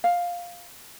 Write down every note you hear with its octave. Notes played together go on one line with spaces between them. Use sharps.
F5